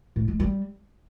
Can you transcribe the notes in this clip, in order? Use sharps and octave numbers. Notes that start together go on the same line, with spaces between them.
A2
G#3
G3